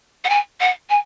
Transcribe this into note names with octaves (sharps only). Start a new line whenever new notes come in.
F#5
G#5
F#5
G#5